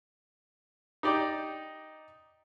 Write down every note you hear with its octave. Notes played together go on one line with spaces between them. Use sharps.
D#4 G4 D5